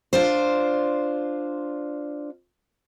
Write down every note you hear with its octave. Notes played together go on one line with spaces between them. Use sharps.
D4 F4 C5